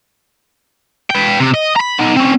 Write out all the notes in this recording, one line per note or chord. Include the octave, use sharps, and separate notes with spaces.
B4 G5
C3
D#5
A#5 B5
B3 D#4
C4 C#4